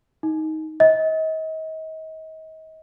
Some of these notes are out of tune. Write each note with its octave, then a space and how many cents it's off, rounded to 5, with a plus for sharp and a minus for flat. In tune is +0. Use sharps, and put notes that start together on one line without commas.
D#4 +15
D#5 +35